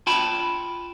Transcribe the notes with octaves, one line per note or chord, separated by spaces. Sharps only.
F4 G5 A5 B5